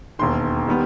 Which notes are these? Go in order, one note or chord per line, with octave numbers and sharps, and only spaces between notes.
E1 D#2 D#3 C6
D#3 G3 B3